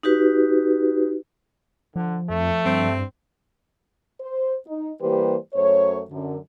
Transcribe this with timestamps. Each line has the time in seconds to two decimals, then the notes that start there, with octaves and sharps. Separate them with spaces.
0.03 D#4 F#4 G4 B4
1.96 D3 F3
2.29 F2 A3
2.65 G2 C4
4.21 C5
4.67 D#4
5.01 E3 G3 A#3 G4 B4 C5
5.54 F#2 A3 C5 C#5
6.11 F#2 D3